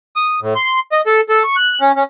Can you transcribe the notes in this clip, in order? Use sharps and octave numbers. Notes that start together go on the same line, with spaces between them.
D#6
A2
C6
D#5
A4
A4
C#6
F#6
C#4
C#4